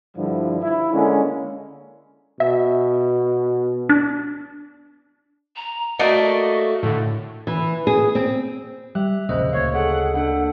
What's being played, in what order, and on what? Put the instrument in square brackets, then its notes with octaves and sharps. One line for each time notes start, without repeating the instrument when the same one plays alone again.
[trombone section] G2 D3 F3 G3 E4
E4
D3 G#3 A#3 C#4
[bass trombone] B2 [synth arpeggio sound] E5
[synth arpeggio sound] D4
[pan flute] A#5
[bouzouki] A3 A#3 [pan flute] F#4 [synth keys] D5 D#5
[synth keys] A2 D3
[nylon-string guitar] E3
G#4
C4
[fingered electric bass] G3 [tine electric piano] G4 [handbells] E5 F#6
[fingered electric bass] E1 A#1 [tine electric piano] C#3 D#5 [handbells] A#3 C5 F#6
[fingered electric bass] D2 [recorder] C#5 [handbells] F5 C#6
[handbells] G#4 A4 [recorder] F#5
[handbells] A#3 D4 A4 [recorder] F#5